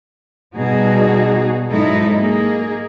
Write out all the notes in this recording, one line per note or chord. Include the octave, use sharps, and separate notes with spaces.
B2 G3 D#4 F#4 G#4
G#2 F#3 G#3 D#4 E4 A4
A#3 D#4 G#4